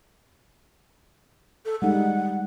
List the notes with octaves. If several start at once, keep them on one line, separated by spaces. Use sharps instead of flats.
A4
G3 G#3 D#4 F#5